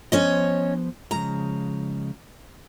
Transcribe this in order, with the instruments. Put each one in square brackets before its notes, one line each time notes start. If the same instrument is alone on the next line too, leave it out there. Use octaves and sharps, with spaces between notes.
[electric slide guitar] F3 B3 C5 [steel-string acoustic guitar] C#4 C#5 D#5
[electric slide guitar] C#3 F3 G#3 [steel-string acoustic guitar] A#5